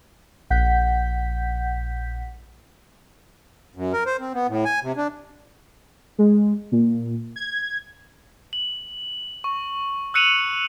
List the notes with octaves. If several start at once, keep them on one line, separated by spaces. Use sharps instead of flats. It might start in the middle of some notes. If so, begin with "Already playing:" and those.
A#1 F#5 G6 B6
F#2
A#4
C5
C4
B3
A2
G#5
C3
D4
G#3
A#2
G#6
F#7
C#6
E6 F#6 C#7 D#7 F7 F#7